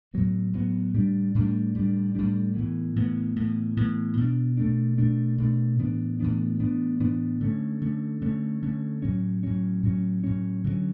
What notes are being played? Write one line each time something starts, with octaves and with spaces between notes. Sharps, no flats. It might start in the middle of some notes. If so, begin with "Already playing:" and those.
A2 F#3 B3
A2 F#3 B3
A2 G3 D4
A2 G3 D4
A2 G3 D4
A2 G3 D4
A2 E3 B3
A2 E3 B3
A2 E3 B3
A2 E3 B3
B2 A3 D4
B2 A3 D4
B2 A3 D4
B2 A3 D4
A2 E3 B3 D4
A2 E3 B3 D4
A2 E3 B3 D4
A2 E3 B3 D4
D3 A3 C#4
D3 A3 C#4
D3 A3 C#4
D3 A3 C#4
A2 F#3 C#4
A2 F#3 C#4
A2 F#3 C#4
A2 F#3 C#4
D3 F#3 A3 C#4